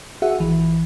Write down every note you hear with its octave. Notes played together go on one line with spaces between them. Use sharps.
F#4 G#4 E5 F#5
A#1 E3